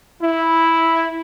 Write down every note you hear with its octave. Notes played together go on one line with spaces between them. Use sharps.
E4